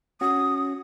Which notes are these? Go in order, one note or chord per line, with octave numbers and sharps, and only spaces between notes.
C#4 F#4 D#6